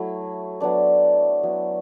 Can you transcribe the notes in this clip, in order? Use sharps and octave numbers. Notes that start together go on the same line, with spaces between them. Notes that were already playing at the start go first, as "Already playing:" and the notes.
Already playing: F#3 A3 E4
F#3 B3 D4 D5
F#3 B3 E4